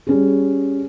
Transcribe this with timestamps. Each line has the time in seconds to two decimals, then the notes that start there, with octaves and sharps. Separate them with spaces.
0.07 G3 C#4 G#4